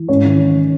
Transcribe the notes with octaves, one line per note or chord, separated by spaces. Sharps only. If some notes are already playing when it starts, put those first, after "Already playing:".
Already playing: E3
G#2 C#4 C#5
D#3